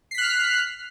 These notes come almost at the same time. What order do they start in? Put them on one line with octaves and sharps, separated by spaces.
C7 B6 F#6 F6